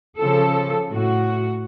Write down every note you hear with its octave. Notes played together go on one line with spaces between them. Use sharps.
C#3 F3 A4
A2 F#4